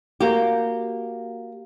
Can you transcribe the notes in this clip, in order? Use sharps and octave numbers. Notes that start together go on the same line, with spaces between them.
A#3 F#4 G4